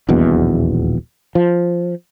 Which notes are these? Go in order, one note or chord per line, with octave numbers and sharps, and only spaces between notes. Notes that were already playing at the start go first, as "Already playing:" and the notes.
D#1 A#1 E2 B2
F3